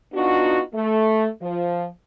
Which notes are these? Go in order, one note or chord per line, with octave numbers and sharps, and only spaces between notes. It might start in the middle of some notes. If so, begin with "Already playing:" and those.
B3 D4 D#4 F4 F#4
A3
F3